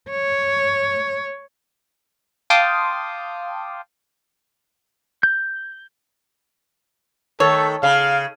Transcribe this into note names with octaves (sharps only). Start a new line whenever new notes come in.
C#5
F5 G5 A5 C6 D6 D#6
G6
D#3 A3 A4 C#5
C#3 F5